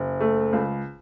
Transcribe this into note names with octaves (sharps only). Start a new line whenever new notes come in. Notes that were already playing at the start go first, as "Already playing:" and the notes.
Already playing: F#1
A3
C#2